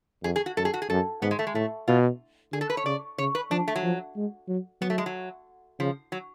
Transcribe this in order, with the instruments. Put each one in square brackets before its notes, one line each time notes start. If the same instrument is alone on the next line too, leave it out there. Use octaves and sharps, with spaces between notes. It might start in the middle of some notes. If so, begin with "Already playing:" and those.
[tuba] F2 [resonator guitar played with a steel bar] G#4
[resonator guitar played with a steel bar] G#4
F#4
[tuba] F#2 [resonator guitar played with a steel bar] A4
[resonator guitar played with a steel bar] G#4
F#4
G#4
[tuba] F#2 [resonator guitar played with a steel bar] A4
[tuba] G#2 [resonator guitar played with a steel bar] B3
[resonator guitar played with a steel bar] G#3
A3
G#3
[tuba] A2 [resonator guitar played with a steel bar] A3
[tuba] B2 [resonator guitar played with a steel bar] F4
[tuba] D3 [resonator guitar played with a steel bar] G#4
[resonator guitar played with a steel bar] A4
B4
C#5
[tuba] C#3 [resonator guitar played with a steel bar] D5
[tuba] C#3 [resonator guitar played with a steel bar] C#5
[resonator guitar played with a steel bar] B4
[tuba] F3 [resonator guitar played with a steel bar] D4
[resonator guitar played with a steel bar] A3
F#3
[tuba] F3
G#3
F#3
[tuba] F#3 [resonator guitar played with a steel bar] B3
[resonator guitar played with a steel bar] A3
G#3
F#3
[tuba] C#3 [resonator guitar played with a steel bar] F3
[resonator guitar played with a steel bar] F#3